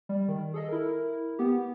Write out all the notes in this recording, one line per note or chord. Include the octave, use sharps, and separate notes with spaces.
G3
D#3
G#4 A4 D#5
E4 A#4
B3 G4